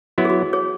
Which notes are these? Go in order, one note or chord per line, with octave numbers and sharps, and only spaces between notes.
F#3 B3 E4 F#4
G#4
F#4
G#4 C#5